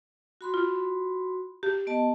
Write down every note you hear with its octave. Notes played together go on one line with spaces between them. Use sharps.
F#4 B5 C6
F4
G4
B3 D#5 A5